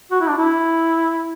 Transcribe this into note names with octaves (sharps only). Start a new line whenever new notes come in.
F#4
E4
D4
E4